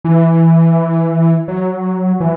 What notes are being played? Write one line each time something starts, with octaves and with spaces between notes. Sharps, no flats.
E3
F#3
E3